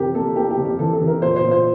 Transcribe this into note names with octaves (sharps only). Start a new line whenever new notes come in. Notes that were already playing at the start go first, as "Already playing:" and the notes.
Already playing: F2 C3 E3 G4 A#4
A#3 A4
A#3 G4
G4
F2
G4
E3 A4
A4
E3
A#4
A#2 C5
C5
A#2
C5